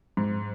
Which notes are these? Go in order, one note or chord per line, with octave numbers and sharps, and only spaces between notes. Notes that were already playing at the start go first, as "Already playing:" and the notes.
G#2